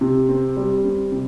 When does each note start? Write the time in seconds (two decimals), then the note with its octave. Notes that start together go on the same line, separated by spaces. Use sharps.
0.01 C3
0.29 C4
0.57 G3
0.84 C4
1.12 C3